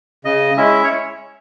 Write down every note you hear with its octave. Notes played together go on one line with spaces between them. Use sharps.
C#3 D#5
G#3 C#4 E4 E5
C#5